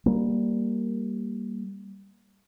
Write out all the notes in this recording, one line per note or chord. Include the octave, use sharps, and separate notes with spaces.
G3 A#3